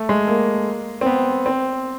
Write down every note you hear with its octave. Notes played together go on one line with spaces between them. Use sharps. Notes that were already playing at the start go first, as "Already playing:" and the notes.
Already playing: A3
G#3
A#3
C4
B3
C4